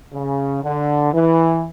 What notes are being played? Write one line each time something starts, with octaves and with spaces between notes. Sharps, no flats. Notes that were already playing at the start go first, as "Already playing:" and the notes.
C#3
D3
E3